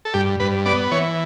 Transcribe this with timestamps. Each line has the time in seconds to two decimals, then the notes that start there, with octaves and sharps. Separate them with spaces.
0.05 A4
0.14 G2 G4
0.40 G2 B4
0.65 B3 D5
0.91 E3 C#5